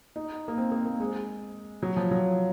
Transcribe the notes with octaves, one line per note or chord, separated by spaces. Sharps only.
D#4
A#3
C4
A#3
A#3
G#3
F#3
F3
F#3